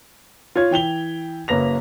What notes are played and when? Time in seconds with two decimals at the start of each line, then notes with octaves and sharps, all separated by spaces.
0.55 F4 C#5 G#6
0.71 E3 G5 F7 G7
1.48 F#1 F#2 A#3 B4 A#6 F7